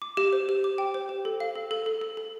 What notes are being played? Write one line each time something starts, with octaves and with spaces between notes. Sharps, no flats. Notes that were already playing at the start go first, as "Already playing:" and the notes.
D6
G4
C5
G4
D6
G5
C5
G4
A4
F5
A4
A4
A4
A4
A4